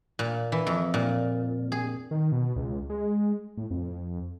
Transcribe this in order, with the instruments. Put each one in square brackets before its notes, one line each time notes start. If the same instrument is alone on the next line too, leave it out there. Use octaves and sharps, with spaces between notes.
[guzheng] A#2
E3
F2
A#2
G#4
[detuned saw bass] D#3
B2
C#2
G#3
A2
F2